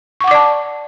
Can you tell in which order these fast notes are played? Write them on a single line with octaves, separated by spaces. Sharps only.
C#6 F#5 D6 D5 A5